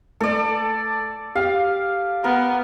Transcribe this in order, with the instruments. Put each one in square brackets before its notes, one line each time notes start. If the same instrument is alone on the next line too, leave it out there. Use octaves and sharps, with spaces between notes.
[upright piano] A3 [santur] A4 D5
[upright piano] G4 [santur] F5
[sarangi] B3 [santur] A#4